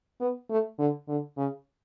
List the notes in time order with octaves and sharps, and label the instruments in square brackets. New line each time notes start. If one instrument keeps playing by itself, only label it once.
[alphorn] B3
A3
D3
D3
C#3